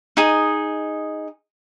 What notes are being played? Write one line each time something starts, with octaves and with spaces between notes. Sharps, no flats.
D#4 G#4